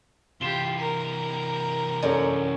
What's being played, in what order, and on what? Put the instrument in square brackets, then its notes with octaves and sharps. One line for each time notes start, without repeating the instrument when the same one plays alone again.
[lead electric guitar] C3 E3 [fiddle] F4 G4 [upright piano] E7 G7
[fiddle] A#4
[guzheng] F#2 [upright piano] A4 C#5 D5